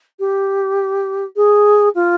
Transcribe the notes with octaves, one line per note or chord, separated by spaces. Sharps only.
G4
G#4
F4